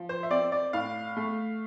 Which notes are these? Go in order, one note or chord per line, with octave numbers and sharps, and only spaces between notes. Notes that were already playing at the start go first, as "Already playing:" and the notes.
Already playing: F3
C5
E5
C4 D5
D5
A2 F5
A3